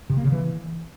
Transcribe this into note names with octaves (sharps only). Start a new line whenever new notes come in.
C3
A#3
C#3
E3